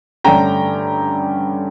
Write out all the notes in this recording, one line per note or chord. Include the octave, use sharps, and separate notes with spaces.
G2 D3 A3 C#4 G5 A#5